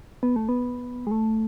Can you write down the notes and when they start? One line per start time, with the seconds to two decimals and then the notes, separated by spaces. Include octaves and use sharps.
0.23 B3
0.36 A3
0.49 B3
1.07 G#3
1.11 A3